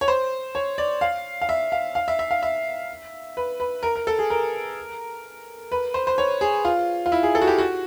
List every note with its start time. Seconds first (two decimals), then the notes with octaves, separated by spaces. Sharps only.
0.01 C#5
0.08 C5
0.55 C#5
0.78 D5
1.01 F5
1.42 F5
1.49 E5
1.72 F5
1.95 F5
2.08 E5
2.19 E5
2.31 F5
2.43 E5
3.37 B4
3.60 B4
3.83 A#4
3.96 A#4
4.07 A4
4.19 G#4
4.30 A#4
5.72 B4
5.94 C5
6.07 C5
6.18 C#5
6.41 G#4
6.65 F4
7.06 F4
7.12 E4
7.23 G#4
7.35 A4
7.42 F#4
7.47 G4
7.58 F#4